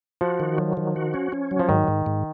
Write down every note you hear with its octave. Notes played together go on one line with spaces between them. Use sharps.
F3 F#4
D#3
F#3
D#3
F#4
C#4
C#4
F#3
F3
G#2 D#3
G#2
G#2